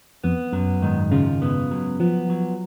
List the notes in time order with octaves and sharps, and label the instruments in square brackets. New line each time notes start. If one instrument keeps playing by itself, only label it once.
[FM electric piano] F2 [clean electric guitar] B3
[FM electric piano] F#2 [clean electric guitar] F#3
[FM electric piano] G#2 [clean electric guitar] D#3
[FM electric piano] C#3 [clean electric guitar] F4
[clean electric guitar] B3
F#3
[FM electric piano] F3 [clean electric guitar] B3
[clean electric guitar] F#3